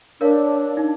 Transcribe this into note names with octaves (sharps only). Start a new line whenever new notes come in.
D4 A#4 C#5 F5
D#4